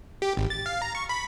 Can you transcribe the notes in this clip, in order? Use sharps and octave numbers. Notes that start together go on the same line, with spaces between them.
G4
G#1
A6
F5
A#5
C#6
B5